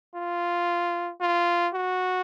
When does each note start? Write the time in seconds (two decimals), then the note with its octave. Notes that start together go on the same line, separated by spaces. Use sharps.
0.15 F4
1.21 F4
1.74 F#4